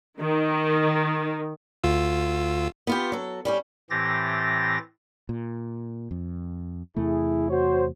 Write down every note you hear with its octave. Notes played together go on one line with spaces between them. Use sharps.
D#3
D2 F4 E6
B3 F4 G4
F#3 A4
G3 C#4 G4
A2 E3 C4 G4 A6 A#6
A#2
F2
E2 C3 A3 E4 G#4
F#4 C5 C#5